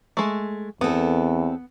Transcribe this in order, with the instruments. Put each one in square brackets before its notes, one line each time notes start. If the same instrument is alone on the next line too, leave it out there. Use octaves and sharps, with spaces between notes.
[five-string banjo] G#3 A3
[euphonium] E2 [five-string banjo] B3 [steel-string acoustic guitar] C4 A4